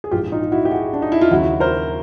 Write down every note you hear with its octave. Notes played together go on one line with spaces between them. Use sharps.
G#4
A#1 G#2 E3 F4 G4
D#4 F4
E4 F#4
G4
F#4 G#4
D4
D#4
E4
F4
D#2 C#3 F#3 E4 F#4
A#4 C5